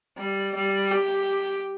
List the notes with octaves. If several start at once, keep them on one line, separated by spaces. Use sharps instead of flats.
G3
G3
G4